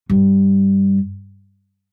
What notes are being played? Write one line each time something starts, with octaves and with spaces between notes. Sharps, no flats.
G2